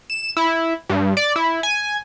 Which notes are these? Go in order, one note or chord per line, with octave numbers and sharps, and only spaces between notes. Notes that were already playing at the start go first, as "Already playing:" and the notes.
E7
E4
G2
D5
E4
G#5